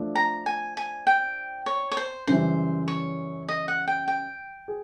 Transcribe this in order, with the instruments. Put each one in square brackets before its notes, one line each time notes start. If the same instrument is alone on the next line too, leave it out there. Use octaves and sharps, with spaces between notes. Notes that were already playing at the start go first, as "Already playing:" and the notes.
Already playing: [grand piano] F3 A3 D4
[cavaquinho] A#5
G#5
G#5
G5
C#5
C#5
C5
[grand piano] F#2 C#3 E3 G3 [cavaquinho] C5
[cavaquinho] C#5
D#5
F#5
G5
G5
[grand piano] G#4